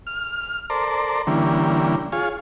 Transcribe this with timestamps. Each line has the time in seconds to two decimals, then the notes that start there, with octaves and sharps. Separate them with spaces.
0.07 F6
0.70 A4 A#4 C5 D5
1.27 D3 E3 G3 A#3 C#4
2.12 F4 G#4 C#5